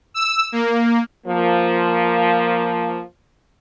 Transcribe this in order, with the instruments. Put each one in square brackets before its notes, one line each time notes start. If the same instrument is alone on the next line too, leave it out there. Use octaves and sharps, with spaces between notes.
[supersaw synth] E6
A#3
[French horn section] F3 A#3